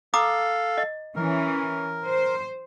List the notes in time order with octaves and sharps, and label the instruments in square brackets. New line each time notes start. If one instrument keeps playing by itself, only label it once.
[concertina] A4 F5 [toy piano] A#5 D6 D#6
[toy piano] D#5
[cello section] E3 C#4 [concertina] A#4
[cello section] C5